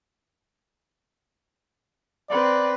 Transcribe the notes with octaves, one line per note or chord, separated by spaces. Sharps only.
C4 B4 D5